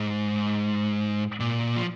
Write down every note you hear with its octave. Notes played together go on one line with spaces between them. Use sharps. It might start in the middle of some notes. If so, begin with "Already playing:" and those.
Already playing: G#2
A#2
F3